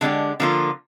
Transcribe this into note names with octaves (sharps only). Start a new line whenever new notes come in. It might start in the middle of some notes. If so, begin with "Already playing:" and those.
D3 G#3 D4 G4
D3 F3 A#3 F4